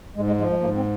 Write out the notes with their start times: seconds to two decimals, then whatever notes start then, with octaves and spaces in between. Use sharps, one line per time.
0.16 G#2 G#3
0.27 G#3
0.39 F3 G#3
0.50 G#3
0.60 G#2 A#3
0.76 C4